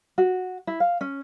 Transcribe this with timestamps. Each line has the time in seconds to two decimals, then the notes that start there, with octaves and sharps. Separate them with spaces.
0.18 F#4
0.67 E4
0.80 F5
1.01 C#4